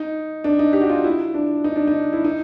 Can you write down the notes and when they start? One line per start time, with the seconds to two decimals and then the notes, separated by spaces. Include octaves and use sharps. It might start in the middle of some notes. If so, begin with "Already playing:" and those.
Already playing: D#4
0.44 D4
0.59 D#4
0.73 G4
0.82 F#4
0.90 F4
1.04 E4
1.34 D4
1.64 D#4
1.76 D4
1.87 D#4
2.13 E4
2.24 D#4